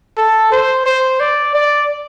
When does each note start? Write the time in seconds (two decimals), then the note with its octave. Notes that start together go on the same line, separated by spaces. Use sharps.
0.18 A4
0.52 C5
0.86 C5
1.20 D5
1.55 D5